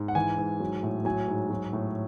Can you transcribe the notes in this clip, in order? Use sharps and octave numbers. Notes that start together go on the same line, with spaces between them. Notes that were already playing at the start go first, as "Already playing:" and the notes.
Already playing: G#2
F#5
E3 G#5
G#2
F#3
A2
F#3 G#5
G#2
F#3
A2